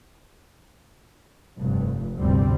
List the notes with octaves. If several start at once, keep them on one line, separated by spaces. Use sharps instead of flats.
F1 G2
G1 D2 A2 C3 G3 C4